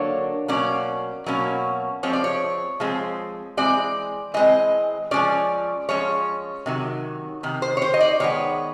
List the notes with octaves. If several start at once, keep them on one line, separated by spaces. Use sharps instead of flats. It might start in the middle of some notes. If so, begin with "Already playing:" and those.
Already playing: D3 F#3 A#3 D4 C#5
B2 F#3 A#3 C#4 D5
B2 F#3 A#3 C#4
F3 G#3 C4 C#5
D5
C#5
F3 G#3 C4
E3 G#3 C4 D5
E3 G#3 C4 D#5
F3 G#3 C#4 D5
F3 G#3 C#4 C#5
C3 D#3 F#3
C3 D#3
C5
C#5
C5
D#5
D5
D#3 G#3 B3 C#5